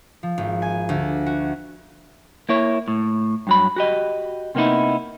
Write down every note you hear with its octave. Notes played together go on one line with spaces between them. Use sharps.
F3
G#1
G#5
D2
F#4
A#3 E4 C#5
A2
G2 F#3 B5
F#4 G4 D#5
C3 A#3 B3 D#4 E4